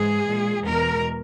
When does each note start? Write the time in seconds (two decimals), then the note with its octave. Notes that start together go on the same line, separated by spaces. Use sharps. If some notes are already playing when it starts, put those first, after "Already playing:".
Already playing: G#2 E3 G#3 G#4
0.27 A#2 G#3
0.64 E2 B2 G#3 A#4